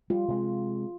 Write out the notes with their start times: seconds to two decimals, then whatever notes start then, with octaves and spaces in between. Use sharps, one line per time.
0.10 G3 F4
0.28 C3 G#3